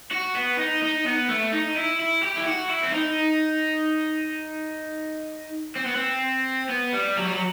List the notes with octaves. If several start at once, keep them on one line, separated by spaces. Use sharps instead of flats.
F#4
B3
D#4
D#4
B3
A3
D#4
E4
E4
G4
E4
F#4
E4
C4
D#4
C4
B3
C4
B3
G3
F#3
G3
F#3